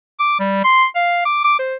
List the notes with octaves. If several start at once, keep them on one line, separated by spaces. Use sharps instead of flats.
D6
G3
C6
F5
D6
D6
C5